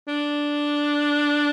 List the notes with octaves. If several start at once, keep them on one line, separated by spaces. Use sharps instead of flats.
D4